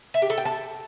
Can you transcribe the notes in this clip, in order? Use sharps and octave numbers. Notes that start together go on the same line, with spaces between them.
E5
G4
A4
G5
A5